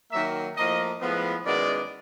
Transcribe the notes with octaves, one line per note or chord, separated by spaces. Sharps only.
D#3 F#3 A#3 E5
A2 F3 A#3 D#5
A2 F3 G#3 B3
F#2 D#3 G#3 B3 E4 D5